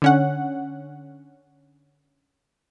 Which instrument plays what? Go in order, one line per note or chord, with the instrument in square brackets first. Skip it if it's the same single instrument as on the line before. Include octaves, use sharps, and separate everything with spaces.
[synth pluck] D3 C#4 F#5